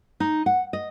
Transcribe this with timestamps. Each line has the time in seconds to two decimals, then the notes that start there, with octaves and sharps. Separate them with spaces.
0.20 D#4
0.46 F#5
0.73 D#5